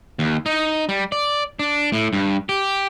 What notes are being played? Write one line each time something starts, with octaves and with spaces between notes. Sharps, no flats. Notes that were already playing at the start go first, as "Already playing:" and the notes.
D#2
D#4
G3
D5
D4
A2
G2
G4